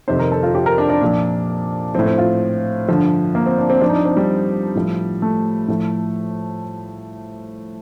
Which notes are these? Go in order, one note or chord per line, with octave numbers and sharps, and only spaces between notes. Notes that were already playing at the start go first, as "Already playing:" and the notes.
F2 C3 D#3 C5
A#4
A4
F4
G4
A#4
D4
D4
A#2 F3
A2 F3 C4
C4
F4
G2 D3 F3
A#3
C4
D4
C4
G2 F3 D4
D#4
D4
C4
G3
A2 F3
A3
A2 F3